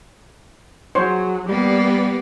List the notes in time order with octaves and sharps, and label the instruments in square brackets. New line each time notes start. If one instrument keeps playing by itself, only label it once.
[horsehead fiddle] F#3 G#4 [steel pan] C5 C#5
[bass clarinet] G3 [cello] A#3 B3 [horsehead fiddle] G4 D5